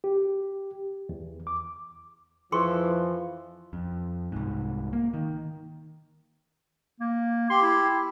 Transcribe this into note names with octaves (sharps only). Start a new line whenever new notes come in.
G4
E2
D6
F2 E3 F3 G#4 C6 C#6
F2
C2 G#2
A#3
D#3
A#3
G4 C6
E4